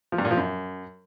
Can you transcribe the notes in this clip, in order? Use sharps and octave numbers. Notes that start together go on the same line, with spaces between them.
F3
G2
A#2
F3
F#2